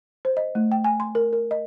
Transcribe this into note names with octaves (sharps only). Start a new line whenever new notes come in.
C5
D#5
A3
G5
G#5
C6
A#4
A#4
D#5